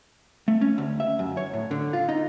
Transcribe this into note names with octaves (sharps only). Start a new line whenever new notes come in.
A3
C#4
D2
E5
F#2
C#5
A2
D3
F4
D#4